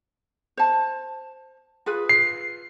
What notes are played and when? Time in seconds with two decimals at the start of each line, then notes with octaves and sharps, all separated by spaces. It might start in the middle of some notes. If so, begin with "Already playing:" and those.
0.57 C5 A5
1.86 F4 G#4 B4
2.09 C7